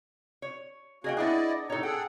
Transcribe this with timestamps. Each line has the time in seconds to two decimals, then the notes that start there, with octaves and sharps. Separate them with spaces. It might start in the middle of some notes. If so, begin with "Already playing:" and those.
0.42 C#5
1.04 A#3 C#4 F#4 G#4 D#5 G5
1.17 B3 D4 E4 G#4 D5 D#5
1.70 A2 C3 D#4 A4 C#5
1.83 G#4 A4 F#5 G5